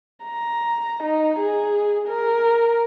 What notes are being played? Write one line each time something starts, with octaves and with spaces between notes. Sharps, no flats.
A#5
D#4
G#4
A#4